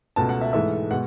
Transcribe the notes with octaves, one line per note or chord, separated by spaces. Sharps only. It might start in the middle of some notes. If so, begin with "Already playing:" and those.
C#2 B2 A3 A5
F#5
E5
G#2 E3 A3 E5
B2 G#3 F#5